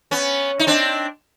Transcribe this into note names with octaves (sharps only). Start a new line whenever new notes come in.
B3 C#4
D#4
C4 D4